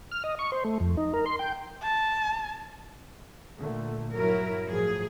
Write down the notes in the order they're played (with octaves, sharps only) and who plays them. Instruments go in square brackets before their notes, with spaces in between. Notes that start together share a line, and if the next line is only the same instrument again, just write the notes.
[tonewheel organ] F6
D#5
C#6
C5
A3
F2
D#4
A#4
C6
G5
[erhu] A5
[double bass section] A#2 D3 A3
[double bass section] G2 F#3 [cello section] E4 A#4
[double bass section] A2 F3 F#3 [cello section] G#4